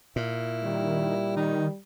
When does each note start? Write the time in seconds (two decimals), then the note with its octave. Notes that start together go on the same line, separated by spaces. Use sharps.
0.16 A#2 E4
0.64 D#3 G3
1.36 D#3 D#4